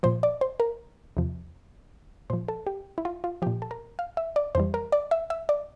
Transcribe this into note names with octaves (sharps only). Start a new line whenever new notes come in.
A#2 F3 C5
D5
C5
A#4
E2 C3 F3
A#2 F3 C5
A4
G4
E4
F4
F4
A#2 F3 G4
A4
A#4
F5
E5
D5
F2 E3 G3 C5
A#4
D5
E5
E5
D5